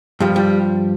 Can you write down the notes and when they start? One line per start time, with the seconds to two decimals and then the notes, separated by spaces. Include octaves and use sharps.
0.20 G2 F3 G3
0.36 G3